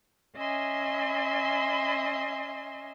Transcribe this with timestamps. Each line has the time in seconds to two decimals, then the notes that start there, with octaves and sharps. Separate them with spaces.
0.36 C#4 D#5 E5 G#5 C6